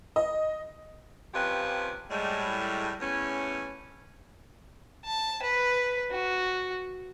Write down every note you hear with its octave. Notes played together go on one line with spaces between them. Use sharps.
D#5
F2 C3 F3 C#4 G4 B4
A2 G3 G#3
E2 A2 E3 C#4
A5
B4
F#4